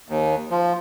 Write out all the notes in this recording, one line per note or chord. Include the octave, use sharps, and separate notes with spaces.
D#2
F3